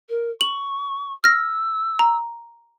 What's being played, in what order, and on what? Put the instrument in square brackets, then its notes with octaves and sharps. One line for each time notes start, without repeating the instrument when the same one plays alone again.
[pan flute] A#4
[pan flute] C#6 [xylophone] F#7
[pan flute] E6 [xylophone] F6 A#6
[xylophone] A#5